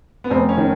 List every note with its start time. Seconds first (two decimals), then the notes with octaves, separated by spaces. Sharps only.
0.24 B3
0.30 F1 C4
0.49 C#4
0.58 D#3